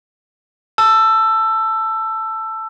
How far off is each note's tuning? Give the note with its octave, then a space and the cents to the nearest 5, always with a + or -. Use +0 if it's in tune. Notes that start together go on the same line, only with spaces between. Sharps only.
A5 +0 E6 +15